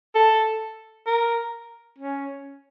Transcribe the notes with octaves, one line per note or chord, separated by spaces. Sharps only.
A4
A#4
C#4